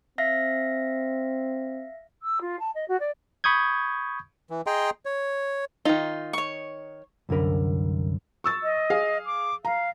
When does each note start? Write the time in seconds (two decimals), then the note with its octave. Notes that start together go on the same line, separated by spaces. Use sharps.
0.18 C4 E5 F5 A#6
2.22 E6
2.41 F4
2.59 A5
2.75 D#5
2.88 F#4
3.00 D5
3.44 B5 C#6 D#6 G6 G#6
4.50 E3
4.67 G#4 D#5 G5 A#5 C6
5.05 C#5
5.85 D#3 D#4 F4
6.33 C#5 C#6
7.29 C2 F#2 D3 A#4 B5
8.44 C#6 E6 A6
8.63 D#5
8.90 G#4 F5
9.26 D6
9.65 F5 A#5